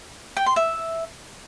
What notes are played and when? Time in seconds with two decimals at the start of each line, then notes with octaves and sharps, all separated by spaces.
0.37 G5
0.46 C6
0.56 E5